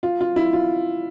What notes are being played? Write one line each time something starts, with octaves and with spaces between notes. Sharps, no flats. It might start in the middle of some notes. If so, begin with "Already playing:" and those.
F4
F4
E4
F4